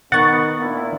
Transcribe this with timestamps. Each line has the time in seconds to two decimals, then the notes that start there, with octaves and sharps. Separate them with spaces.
0.12 D#3 B3 F#5 C#6 A6
0.59 A#2 B3 D4 E4